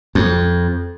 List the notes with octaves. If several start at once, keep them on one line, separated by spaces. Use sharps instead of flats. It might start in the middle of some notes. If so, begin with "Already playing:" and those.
F2